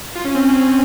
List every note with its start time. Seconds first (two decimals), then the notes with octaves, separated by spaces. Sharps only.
0.15 F4
0.25 C#4
0.35 C4